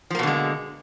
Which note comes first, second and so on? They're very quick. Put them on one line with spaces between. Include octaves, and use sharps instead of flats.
F3 A#3 B2 D3 G#3